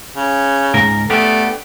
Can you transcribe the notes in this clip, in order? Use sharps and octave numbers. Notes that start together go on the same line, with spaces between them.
C#3
C#2 G#2 A#4
A3 B3 D4 G4